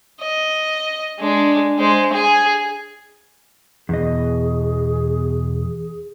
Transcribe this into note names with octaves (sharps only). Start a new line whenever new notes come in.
D#5
G#3 D4
G#3 C5
G#4 G#5
E2 B2 G#4 D#5